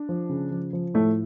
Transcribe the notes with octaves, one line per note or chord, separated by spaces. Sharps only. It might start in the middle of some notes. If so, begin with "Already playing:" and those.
Already playing: D4
F3
C#3
F3
F3
A2 A3